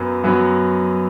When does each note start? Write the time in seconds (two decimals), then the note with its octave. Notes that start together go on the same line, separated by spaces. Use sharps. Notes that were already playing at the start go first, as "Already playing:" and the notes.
Already playing: F#2 F#3 B3
0.23 F#2 F#3 B3